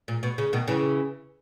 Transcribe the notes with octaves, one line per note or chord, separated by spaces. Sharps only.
A#2
B2
C#3
B2 D#3
C#3 E3